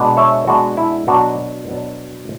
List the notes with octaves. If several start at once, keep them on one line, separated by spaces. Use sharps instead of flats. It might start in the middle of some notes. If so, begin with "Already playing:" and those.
Already playing: B2 G#3 B3 D4
C#5 E5
B2 G#3 B3 D4 F#4
E4
B2 F#3 B3 D4 F#4
B2 F#3 B3 D4